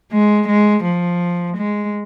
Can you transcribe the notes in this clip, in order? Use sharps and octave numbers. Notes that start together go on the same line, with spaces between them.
G#3
G#3
F3
G#3